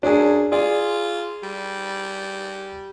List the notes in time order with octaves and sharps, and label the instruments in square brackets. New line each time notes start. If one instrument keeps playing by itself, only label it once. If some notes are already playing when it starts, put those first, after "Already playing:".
[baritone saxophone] F#2 [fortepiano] D4 G#4
[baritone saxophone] F4 [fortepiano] G#4 D5
[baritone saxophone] G3